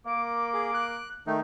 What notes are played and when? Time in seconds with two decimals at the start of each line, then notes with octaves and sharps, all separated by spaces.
0.06 A#3 D6
0.54 G#4
0.74 F#6
1.27 D#3 A3 D#4